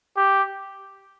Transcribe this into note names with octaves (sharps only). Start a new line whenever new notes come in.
G4